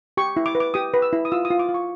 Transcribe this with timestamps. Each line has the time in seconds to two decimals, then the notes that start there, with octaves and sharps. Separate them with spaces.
0.17 G4 C#6
0.37 E4
0.46 D6
0.55 B4
0.60 D6
0.74 G4 D#6
0.94 B4
1.02 E6
1.13 E4
1.25 D#6
1.32 F4 E6
1.45 D#6
1.50 F4
1.59 D6
1.69 F4
1.74 C#6